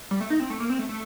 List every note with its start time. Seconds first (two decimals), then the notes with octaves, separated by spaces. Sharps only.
0.11 G3
0.21 A3
0.30 D#4
0.40 C4
0.50 A3
0.60 A#3
0.70 C4
0.79 A3
0.89 A3